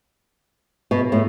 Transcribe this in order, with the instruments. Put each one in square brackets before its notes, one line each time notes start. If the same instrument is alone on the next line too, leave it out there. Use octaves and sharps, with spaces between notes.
[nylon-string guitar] B2
A2